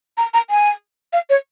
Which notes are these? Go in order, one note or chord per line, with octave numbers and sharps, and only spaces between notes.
A#5
A#5
G#5
F5
C#5